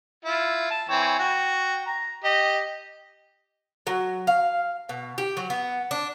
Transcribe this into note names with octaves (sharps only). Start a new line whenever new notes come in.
E4 F4
A5
E3 C4 C#5
F#4 G5
A#5
G4 D#5
F#3
F5
B2
G4
F#3
B3
D4